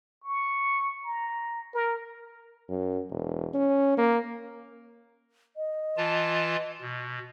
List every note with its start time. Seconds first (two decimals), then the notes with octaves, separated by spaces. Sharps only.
0.24 C#6
1.04 A#5
1.74 A#4
2.69 F#2
3.10 E1
3.54 C#4
3.97 A#3
5.57 D#5
5.97 E3 F4 A5
6.81 B2